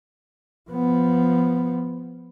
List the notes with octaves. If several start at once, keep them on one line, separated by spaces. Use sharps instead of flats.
F3 B3